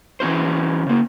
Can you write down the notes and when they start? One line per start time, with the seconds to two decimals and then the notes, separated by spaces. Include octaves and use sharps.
0.20 E3 C#4 F#4 C5
0.87 C#3 A#3